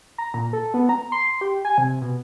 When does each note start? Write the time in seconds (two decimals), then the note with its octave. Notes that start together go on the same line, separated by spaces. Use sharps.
0.18 A#5
0.34 A#2
0.53 A4
0.74 B3
0.89 A#5
1.12 C6
1.41 G4
1.65 G#5
1.78 C3
2.01 B2